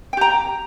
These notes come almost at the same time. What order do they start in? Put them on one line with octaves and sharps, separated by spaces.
G5 G4 A#5